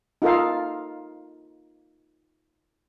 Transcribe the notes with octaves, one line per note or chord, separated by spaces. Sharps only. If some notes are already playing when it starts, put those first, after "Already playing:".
D#4 F4 A4 A#4 F5